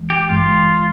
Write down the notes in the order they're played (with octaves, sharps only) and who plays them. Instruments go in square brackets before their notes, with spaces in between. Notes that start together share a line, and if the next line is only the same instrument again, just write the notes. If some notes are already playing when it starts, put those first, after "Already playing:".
Already playing: [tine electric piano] E2 E3 G#3
[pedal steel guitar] G4
[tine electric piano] G#1 G2 E3 G#3 [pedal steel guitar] F4